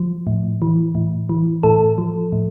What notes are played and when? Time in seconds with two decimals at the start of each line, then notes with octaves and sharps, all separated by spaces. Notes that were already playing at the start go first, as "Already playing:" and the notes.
Already playing: F3
0.27 A2
0.62 E3
0.95 A2
1.29 E3
1.63 A2 A4
1.98 F3
2.32 A2